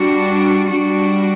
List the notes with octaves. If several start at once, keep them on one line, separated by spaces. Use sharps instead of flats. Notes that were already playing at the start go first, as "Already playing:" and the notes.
Already playing: G3 D4 F#4
G3 D4 F#4